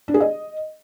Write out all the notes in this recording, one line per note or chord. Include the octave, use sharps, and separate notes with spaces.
D4
G#4
D#5